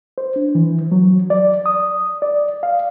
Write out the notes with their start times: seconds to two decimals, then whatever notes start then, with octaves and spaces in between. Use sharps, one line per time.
0.18 C5
0.36 D4
0.55 E3
0.92 F#3
1.30 D5
1.66 D#6
2.22 D5
2.63 F5